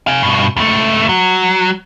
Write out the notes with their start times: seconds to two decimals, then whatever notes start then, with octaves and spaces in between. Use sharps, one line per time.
0.07 F5 G#5
0.23 G2 B2
0.57 C#2 A3
1.09 F#3